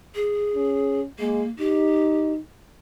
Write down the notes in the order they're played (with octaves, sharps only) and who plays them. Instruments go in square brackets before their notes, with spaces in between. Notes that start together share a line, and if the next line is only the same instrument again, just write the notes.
[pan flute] G#4
[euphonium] C#4
[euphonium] G#3 [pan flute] A#3
[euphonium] D#4 [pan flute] G4